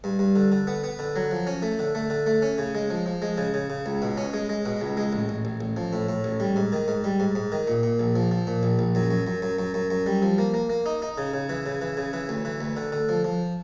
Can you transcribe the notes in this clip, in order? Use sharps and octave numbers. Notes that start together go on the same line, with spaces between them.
G2
G2
D3
D3
B3
B3
D3
F#3
F3
C#4
A3
D3
A3
D3
A3
C#4
C#3
G#3
F3
F3
G#3
C#3
C#3
C#3
C#2
B2
C#4
G#3
G#3
B2
C#2
G#3
A1
A1
A1
A1
F3
A2
A2
A1
G3
G#2
D#3
G#2
G3
G#2
G#2
D#3
A#2
A#2
A#1
F3
F3
A#2
A#1
A#1
F#2
F#2
F#2
F#2
F#2
F#2
F#2
G3
F3
A#3
A#3
A#3
D#4
D#4
C#3
C#3
E3
C#3
E3
C#3
E3
D2
E3
D2
D3
D3
F3
F3